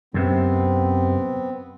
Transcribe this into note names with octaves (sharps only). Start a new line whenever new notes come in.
F#2 C3 B3 C4